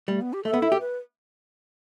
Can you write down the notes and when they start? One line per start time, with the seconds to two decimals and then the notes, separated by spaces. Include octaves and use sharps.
0.08 G3 A3
0.21 B3
0.33 G4
0.45 A3 A4
0.54 B3
0.62 E4
0.72 G4
0.80 B4